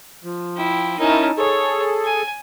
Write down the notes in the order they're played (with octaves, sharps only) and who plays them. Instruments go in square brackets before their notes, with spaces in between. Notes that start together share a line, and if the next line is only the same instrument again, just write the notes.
[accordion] F3
[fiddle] E4 G5
[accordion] C#4 E4 A#4 [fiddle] D#4 A5
[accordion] G#4 A4 [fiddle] C#5
[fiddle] G#5